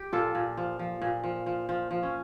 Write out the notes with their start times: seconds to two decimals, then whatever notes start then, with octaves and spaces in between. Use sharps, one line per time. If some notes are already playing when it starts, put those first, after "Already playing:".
Already playing: G4
0.13 A#2 F4 A4
0.35 A#2
0.57 F3
0.79 F3
1.02 A#2
1.23 F3
1.46 F3
1.69 F3
1.91 F3
2.03 C#4